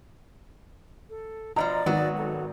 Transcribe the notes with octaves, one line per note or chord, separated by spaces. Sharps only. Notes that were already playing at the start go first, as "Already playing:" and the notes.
A4
B2 E3 F3 D5 D#5 A#5
G#1 D#3 F#3 B3 F#4
A4